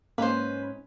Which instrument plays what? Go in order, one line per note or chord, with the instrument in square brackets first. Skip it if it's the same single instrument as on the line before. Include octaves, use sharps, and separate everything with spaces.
[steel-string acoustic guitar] G#2 C#4 [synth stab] A#3 [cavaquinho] B4 C5